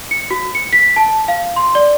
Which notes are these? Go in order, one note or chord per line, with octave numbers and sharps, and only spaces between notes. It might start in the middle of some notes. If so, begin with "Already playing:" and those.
C#7
F#4
C#7
B6
A5
F5
C6
D5